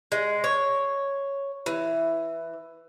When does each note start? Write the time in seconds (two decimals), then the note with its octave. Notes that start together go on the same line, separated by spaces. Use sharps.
0.12 G#3
0.44 C#5
1.66 E3